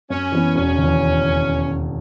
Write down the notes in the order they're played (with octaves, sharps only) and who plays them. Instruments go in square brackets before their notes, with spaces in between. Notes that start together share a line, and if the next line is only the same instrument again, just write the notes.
[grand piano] F#2 [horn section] C#4
[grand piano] E3 B3
[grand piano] E1 [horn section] C#4
[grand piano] D#2 C#3 E3